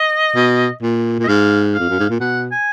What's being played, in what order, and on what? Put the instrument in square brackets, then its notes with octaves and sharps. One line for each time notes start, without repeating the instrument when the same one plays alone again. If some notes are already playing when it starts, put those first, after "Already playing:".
Already playing: [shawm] D#5
[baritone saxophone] B2
A#2
A#2
[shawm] D#5
[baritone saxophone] G#2 [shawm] F5
[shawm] F5
[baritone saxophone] F2
F#2
G#2
A#2
[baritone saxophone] B2 [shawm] F#5
[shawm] G#5